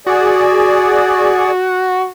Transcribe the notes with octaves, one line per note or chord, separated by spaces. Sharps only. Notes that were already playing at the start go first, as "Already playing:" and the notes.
F#4 G#4 D5